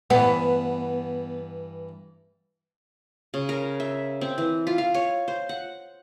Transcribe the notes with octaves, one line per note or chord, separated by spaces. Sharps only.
G2 E3 B3
C#3
A#4
E5
C4
E3
F4
F5
C#5
C5
F#5